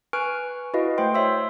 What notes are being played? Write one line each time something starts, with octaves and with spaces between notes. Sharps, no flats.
B4 G#5 C#6 F6 F#6 D7
E4 F#4 B4 D#5 F5
A3 C5 G5 C6
C#5 E5 C6 E6